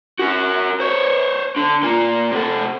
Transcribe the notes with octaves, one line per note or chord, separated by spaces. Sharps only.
F#4 A#4
C5 C#5
D3
A#3 F4
C3 A4